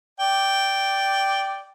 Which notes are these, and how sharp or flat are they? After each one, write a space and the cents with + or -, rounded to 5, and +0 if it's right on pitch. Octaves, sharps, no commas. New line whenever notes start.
D5 -5 G5 -5